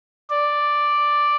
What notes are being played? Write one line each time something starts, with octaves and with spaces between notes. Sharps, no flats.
D5